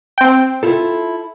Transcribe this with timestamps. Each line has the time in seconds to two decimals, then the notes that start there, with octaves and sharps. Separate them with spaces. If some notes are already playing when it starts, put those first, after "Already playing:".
0.18 C4 G5
0.63 E4 F4 A4